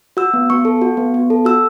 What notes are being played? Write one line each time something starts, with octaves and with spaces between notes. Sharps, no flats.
F#4 E6
B3
B3 C#6
A4
F#4
B3
B3
A4
F#4 E6